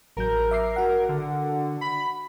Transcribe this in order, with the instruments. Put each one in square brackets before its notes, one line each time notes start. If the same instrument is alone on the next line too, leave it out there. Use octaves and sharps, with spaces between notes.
[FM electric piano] A1 F#3 G6 [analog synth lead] A#4
[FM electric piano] E5 D6 C7
F#4 F#5
[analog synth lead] D3
B5